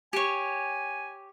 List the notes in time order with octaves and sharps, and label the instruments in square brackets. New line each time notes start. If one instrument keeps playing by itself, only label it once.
[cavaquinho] G4 C#5 [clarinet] G#5